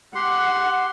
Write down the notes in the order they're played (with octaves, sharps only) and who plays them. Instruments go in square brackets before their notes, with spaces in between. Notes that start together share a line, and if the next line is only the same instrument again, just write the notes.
[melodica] G4 C6 [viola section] F#5